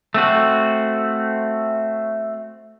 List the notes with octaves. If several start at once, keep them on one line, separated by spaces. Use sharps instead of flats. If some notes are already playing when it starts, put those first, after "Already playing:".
A3 C4 F#4